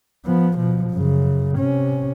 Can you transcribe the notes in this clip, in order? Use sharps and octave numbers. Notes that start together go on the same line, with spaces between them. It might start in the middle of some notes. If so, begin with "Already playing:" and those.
F3 B3
B2 F3
F#2 C#3
C3 C#4